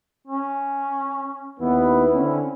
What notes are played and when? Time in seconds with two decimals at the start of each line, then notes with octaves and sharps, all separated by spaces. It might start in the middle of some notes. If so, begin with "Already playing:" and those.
0.27 C#4
1.60 D#2 B3 E4
2.14 D3 C4 C#4